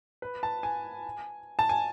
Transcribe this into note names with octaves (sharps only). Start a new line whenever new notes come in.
B4
A5
G#5
A5
G#5